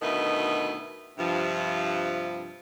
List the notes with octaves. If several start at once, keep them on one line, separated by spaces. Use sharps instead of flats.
D2 B2 D#3 D#4 E4 B4
G2 C3 F3